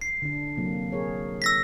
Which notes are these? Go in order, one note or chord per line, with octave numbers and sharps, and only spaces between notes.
C7
D3 D4
C3 F#3 A#3
G#4 A#4 C#5
E6 A#6 B6